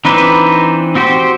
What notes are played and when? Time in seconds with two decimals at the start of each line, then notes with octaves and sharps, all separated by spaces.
0.05 E3 C4 D4 D#4 B4
0.95 C4 F#4 G4 C5